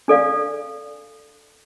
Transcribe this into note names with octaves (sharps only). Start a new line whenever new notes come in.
D4 A4 D5 F5